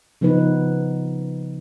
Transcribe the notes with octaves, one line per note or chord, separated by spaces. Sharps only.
C#3 F3 B3 D#4 B4